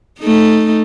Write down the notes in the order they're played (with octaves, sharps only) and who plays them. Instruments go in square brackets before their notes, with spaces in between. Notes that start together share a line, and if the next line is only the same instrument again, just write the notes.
[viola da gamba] A3 D#4